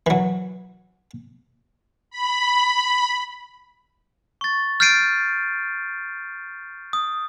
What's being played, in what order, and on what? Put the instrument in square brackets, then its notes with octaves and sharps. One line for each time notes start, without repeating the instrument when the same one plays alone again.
[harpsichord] E3 F#3
[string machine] B5
[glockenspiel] C#6 A6
F6 G6 A6 C7 D7 D#7
D#6